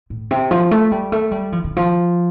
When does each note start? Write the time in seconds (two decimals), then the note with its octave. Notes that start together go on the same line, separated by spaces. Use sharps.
0.10 A2
0.31 C3
0.51 F3
0.71 A3
0.92 G3
1.12 A3
1.31 G3
1.52 F3
1.64 D3
1.76 F3